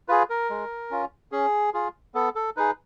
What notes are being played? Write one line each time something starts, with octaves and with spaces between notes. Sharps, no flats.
F4 G#4 B4
A#4
G#3
C#4 F4
C#4 G#4
F4 G#4
B3 A4
A4
D#4 G#4 B4